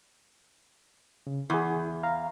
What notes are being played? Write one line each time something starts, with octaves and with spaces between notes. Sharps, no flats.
C#3
E2 E4 G#4
F5 A#5